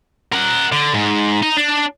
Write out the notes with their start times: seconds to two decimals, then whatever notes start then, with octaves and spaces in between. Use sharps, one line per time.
0.33 A#4 F#5
0.72 D3
0.94 G#2
1.43 D#4
1.57 D4